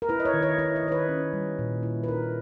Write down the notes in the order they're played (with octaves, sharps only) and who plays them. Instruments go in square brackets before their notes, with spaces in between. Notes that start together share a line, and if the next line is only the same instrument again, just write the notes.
[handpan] A#4
E4 B4
D#5
C#5
D#3
C#5
E4 C#5
D#5
D#3 C#5
B4
C#4
G3
A#2
E4
B4
D#4 A#4